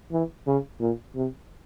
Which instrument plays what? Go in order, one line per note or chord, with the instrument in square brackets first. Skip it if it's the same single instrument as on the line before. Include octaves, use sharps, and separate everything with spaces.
[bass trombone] E3
C#3
A#2
C3